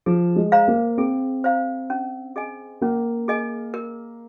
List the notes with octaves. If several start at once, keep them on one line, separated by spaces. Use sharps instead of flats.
F3 G#4
G#3
C5 F5 A#5
A#3
C4 G#4
C5 F5 A#5
C#4
G#4 D#5 G#5
A#3 C#4
G#4 D#5 G#5
A#4